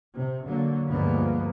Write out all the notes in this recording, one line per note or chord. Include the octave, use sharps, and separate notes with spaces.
C3
D3 F#3 A#3
D2 G2 F3 G#3 A#3 B3